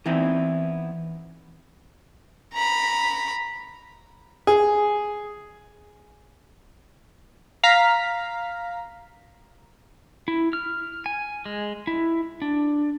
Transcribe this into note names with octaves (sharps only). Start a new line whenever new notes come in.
E3 B3 C4 D#4 E4
A#5 B5
G#4
F5 A#5 B6
E4
F6
G#5
G#3
E4
D4